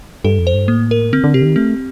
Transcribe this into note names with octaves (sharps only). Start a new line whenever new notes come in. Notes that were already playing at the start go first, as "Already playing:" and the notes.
G2 A4
F2
C5
G2
A2 A#3
A#4
D3 C4
D3
C3 G4
D3
D#3
A3 C4